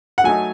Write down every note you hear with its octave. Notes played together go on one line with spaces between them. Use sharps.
F#5
F#3 A3 D#4 G#5